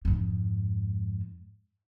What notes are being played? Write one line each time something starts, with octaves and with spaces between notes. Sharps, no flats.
F2 G#2